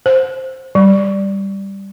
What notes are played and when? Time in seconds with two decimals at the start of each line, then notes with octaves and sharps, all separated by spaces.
0.06 C5
0.75 G3